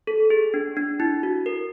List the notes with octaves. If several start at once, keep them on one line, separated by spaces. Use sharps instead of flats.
A4
G#4
D4
D4
E4
F#4
A#4